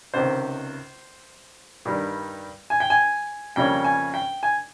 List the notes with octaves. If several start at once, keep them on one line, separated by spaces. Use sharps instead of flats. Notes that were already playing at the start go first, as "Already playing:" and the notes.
C#2 C3 D#3 C5
G2 D#3 G3
G#5
G5
G#5
F2 C#3 G3 A#3 C#4 G5
G#5
G5
G#5